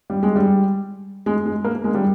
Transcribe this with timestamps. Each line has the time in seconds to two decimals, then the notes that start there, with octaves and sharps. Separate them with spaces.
0.10 G3
0.23 G#3
0.36 G3
1.26 G#3
1.46 G#3
1.64 A#3
1.84 G#3
1.95 G3